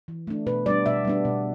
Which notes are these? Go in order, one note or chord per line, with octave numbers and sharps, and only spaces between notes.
E3
A3 D4
B2 B4
G3 B3 D4 D5
B2 E5
G3 B3 D4
B2